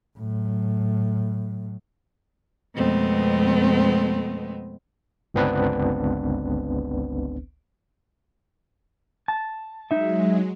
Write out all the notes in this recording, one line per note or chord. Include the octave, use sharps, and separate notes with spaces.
A2 F#3
F2 B2 G#3 A3 B3 C4
G1 C#2 B3 C4 D4 B4
A5
F#3 G#3 D#4 E5